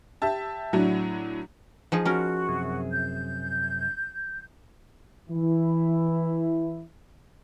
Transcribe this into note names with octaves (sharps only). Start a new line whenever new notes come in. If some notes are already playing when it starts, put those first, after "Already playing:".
G4 E5 A5
A2 F#3 D4 E4 F#4
F3 D#4 G#4
C#4 F#4 A#4
F#2 C3 G#4
G6
E3 E4